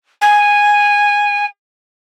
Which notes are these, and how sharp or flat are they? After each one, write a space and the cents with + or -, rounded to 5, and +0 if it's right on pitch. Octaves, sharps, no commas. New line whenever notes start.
G#5 -10